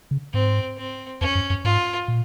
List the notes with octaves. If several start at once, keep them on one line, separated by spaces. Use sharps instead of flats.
C#3
G#2 C4
C4
F2 C#4
F#2
F#2
G#2 F4
A#2